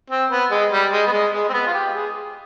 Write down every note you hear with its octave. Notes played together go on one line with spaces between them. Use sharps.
C4
B3
G#3
G3
G#3
B3
G#3
G#3
C4
B3
F4
G4
G#4